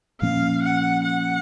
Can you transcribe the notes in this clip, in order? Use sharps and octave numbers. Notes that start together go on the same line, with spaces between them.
A#2 F3 A#3 C#4 F5
F#5
F#5